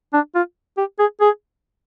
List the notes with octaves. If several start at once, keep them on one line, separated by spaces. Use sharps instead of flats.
D4
F4
G4
G#4
G#4